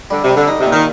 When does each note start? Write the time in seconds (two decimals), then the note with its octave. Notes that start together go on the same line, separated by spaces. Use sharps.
0.10 D3 G3
0.23 C3
0.30 G3
0.36 D3
0.48 D#4
0.60 C3
0.66 A#2
0.72 D#3